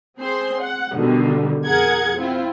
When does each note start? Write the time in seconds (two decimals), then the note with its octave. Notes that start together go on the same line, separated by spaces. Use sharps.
0.18 C4 G#4 C5 C6
0.62 F#5
0.94 B2 D3 D#3 G3
1.66 F2 G#4 A#4 F#5 G#6
2.16 C4 E4 F4